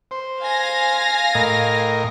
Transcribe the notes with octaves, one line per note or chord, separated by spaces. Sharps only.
C5
F5 G#5 A#6
A2 A#4 D#5